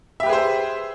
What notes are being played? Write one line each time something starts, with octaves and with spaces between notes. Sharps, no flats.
G4 G#4 B4 C5 E5